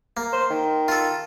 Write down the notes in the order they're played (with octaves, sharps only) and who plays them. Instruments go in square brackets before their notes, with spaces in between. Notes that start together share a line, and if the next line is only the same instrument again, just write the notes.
[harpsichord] A#3
[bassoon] C5
D#3
[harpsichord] F4 A4